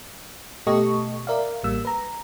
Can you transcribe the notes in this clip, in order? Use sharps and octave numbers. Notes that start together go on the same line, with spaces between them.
B2 A3 G4 A4 D#5 C#6
A#4 D5 E5 F5
A1 G3 A#3 E6
B4 A#5